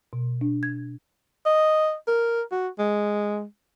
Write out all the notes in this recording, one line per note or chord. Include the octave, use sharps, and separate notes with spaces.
B2
D4
G#6
D#5
A#4
F#4
G#3